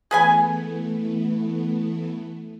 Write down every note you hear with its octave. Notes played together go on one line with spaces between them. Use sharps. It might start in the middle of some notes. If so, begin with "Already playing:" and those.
E3 A3 B3 G#4 B4 G#5